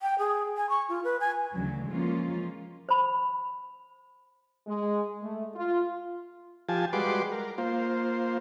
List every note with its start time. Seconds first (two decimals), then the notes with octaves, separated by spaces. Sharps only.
0.02 G5
0.19 G#4
0.57 G#5
0.70 C#6
0.89 F4
1.04 B4
1.20 G#5
1.52 D2 C#3 E3 F#3
1.89 E3 F3 G#3 A#3 C#4 F4
2.89 C5 B5
4.67 G#3
5.22 A3
5.56 F4
6.69 F3 F4 G4 G#5 A5
6.93 G3 G#3 F#4 B4 C6 D6
7.32 A#4
7.58 A#3 F4 C5